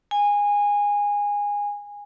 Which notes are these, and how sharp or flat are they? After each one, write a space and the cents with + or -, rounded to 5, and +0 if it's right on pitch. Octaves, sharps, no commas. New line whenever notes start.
G#5 -20